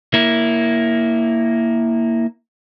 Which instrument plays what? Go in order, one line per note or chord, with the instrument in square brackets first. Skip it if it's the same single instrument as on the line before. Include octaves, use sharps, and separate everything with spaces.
[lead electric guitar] A#3 E4